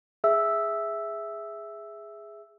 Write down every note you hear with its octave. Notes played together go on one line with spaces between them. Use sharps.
G#4 E5 E6